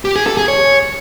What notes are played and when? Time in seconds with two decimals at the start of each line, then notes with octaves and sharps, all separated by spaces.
0.05 G4
0.16 G#4
0.26 A4
0.37 G#4
0.48 C#5